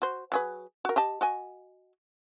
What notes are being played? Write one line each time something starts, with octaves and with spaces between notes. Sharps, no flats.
F#4 C5
F#3 G#4 B4
F#4 A#4
G4 D#5 A5
F#4 D#5 G#5